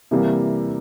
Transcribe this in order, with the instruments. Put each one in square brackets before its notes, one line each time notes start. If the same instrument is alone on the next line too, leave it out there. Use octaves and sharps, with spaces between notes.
[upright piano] C3 E3 G3 A#3